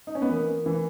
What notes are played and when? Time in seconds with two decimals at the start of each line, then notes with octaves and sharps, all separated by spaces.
0.07 D#4
0.15 C#4
0.22 B3
0.29 E3 A#3
0.66 E3